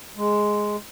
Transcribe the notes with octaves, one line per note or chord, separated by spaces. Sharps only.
G#3